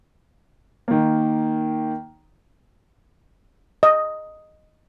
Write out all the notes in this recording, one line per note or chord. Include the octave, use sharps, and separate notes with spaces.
D#3 A#3
D#5